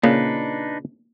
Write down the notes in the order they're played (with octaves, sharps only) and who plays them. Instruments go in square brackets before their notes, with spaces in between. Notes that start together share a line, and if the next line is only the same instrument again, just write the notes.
[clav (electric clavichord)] A#2 C#3 [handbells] A#3 [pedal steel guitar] D4 D#4 B4